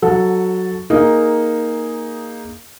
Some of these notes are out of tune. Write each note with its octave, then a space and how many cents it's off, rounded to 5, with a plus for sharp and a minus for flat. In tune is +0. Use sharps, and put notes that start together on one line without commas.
F#3 +0 A4 +0 F#5 -25
A#3 +0 D#4 +5 G#4 +0